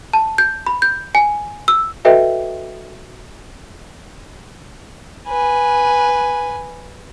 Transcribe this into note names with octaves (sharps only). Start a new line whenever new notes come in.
A5
G6
B5
G6
G#5
E6
F#4 A4 B4 D#5 E5 G5
B4 G#5